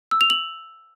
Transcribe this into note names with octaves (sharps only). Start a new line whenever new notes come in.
E6
F7
F#7